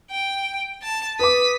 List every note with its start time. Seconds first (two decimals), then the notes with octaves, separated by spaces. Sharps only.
0.10 G5
0.83 A5
1.19 B4 D6 D#6 B6